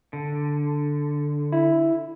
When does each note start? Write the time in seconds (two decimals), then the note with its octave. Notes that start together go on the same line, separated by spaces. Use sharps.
0.13 D3
1.52 E4